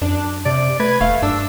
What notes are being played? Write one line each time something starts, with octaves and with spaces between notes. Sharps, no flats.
F#2 D4
C3 D5
A3 B4 G#6
E1 A3 F5
G2 D4 E6